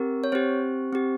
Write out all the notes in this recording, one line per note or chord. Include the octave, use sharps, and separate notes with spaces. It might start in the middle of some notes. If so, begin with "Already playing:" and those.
Already playing: C4 G4 A#4
C#5
C4 G4 C5
C4 G4